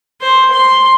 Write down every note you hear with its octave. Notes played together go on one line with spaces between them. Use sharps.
C5
C6